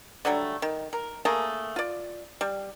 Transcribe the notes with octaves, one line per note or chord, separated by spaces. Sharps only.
D3 F#3 G3 A3
D#3
A#4
A3 A#3 G#4 A5
F4 D5
G3